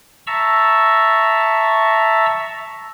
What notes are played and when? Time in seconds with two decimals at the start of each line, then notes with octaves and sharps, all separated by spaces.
0.27 E5 A5 A#5 C#6 E6